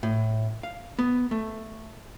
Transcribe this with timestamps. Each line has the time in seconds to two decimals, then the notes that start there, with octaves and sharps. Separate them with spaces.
0.03 A2
0.63 F5
0.99 B3
1.31 A3